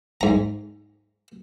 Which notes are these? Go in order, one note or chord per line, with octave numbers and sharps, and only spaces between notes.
G#2 A#5